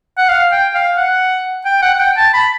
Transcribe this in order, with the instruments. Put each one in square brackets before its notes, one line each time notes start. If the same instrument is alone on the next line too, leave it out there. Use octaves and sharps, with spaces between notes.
[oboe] F#5
F5
G5
F5
F#5
G5
F#5
F#5
G5
A5
B5